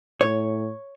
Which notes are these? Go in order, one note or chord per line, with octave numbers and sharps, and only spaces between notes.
A2 C#5